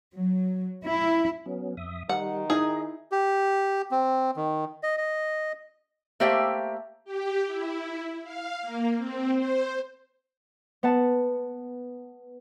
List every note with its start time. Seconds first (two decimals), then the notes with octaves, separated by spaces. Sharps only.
0.14 F#3
0.84 E4
1.46 F#3 B3 C#4
1.77 F2 E5 D#6
2.09 D#3 G3 F#5
2.50 D#4 E4 G#4 D#5
3.12 G4
3.91 C4
4.36 D#3
4.83 D#5
4.98 D#5
6.20 A3 A#3 G4 C5 E5 G5
7.05 G4
7.47 E4
8.24 F5
8.62 A#3
8.98 C4
9.33 C5
10.83 B3 F#5 A5